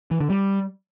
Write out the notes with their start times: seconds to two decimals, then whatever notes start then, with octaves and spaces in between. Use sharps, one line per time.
0.11 E3
0.20 D3
0.30 G3